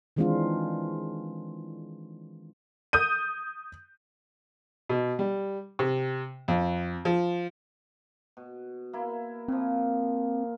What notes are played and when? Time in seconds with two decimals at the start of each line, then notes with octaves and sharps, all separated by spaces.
0.16 D#3 E3 G#3 C4 D4 F4
2.93 D#6 G6 D#7
4.89 B2
5.19 G3
5.79 C3
6.48 F2
7.05 F3
8.37 B2
8.93 A#3 E4
9.48 A#2 F3 C4